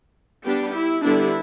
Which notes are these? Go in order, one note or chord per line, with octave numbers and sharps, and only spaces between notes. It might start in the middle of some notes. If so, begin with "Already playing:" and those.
G3 B3 D4 G4
E4
D3 G3 B3 D4 E4